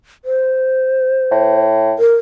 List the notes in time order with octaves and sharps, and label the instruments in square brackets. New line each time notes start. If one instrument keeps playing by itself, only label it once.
[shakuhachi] C5
[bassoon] A2
[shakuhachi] A#4